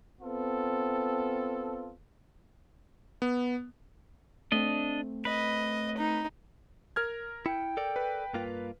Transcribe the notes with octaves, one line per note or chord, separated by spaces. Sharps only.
B3 C4 F4 A4
B3
A3 C4 D4 D#5
B4 D#5
D#4
A#4 F6 G#6
E4 G5 C#7
A4 A#4 D5
B4
G2 A#3 F4